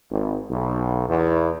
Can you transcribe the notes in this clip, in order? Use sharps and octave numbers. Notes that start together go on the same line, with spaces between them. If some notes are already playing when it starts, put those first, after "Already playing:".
G#1
B1
E2